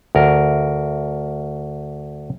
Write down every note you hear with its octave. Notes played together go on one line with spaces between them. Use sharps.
D2 A#4